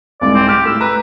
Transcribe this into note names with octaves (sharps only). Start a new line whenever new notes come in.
C2 G#2 D5
C4
G4 F6
A2 E6
B4 A#5